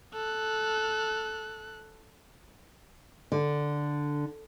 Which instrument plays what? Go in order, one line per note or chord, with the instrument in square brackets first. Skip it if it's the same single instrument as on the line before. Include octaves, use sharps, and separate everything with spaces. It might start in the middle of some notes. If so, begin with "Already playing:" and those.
[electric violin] A4 F#6
[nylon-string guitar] D3